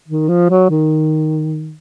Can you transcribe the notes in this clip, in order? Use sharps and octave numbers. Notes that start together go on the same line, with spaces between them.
D#3
F3
F#3
D#3